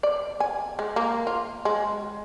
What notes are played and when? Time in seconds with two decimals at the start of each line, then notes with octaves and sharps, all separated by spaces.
0.03 D5
0.40 G#5
0.79 G#3
0.96 A#3
1.27 F4
1.65 G#3